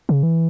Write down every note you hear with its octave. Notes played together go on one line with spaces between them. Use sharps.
C#3
E3